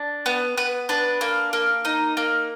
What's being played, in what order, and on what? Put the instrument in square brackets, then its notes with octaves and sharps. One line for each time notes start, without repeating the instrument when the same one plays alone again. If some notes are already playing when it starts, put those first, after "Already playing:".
Already playing: [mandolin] D4
B3
B3 B4
D4 B4
A#3
A#3
D#4
A#3